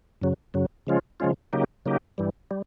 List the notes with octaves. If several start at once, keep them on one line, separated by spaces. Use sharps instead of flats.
F#2 C#3 F#3
F#2 C#3 F#3
C#3 F3 G#3 C#4 F4
C#3 F3 G#3 C#4 F4
C#3 F#3 A#3 D#4 G4
C#3 F#3 A#3 D#4 G4
G2 E3 G3
G3